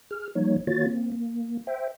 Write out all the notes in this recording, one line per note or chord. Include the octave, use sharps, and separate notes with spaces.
G#4 F6
F3 G3 A#3 D#4 C#5
D#3 A#3 F4 F#4 C#5 A6
A#3 C4
A#3
C5 E5 G5